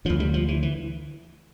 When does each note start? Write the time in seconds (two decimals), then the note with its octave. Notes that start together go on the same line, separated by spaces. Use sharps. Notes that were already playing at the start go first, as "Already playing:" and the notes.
0.05 D2 D3 F3
0.20 G3
0.34 F3
0.48 E3
0.63 E3